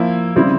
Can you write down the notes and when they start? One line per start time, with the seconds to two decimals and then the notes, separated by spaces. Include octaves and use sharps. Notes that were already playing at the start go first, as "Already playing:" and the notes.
Already playing: F3 A#3 E4
0.36 C#3 G3 C4 E4